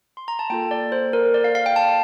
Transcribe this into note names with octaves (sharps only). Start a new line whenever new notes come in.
C6
A#5
A5
A#3 F4 A4 G5
D5
C5
A#4
D5
F5
F5
G5
A5